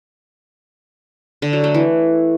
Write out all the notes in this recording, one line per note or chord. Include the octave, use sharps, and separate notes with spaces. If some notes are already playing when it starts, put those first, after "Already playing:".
D3
F#3
A3
E3